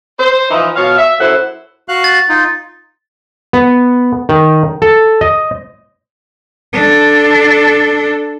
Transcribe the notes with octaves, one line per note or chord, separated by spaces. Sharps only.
C5
E3 F3 D#4
B2 C#5 F5
E5
F#2 E4 A4 C5 F#5
F#4 F5 F#6
A6
D#4 F4
B3
D#3
A4
D#5
D4 A4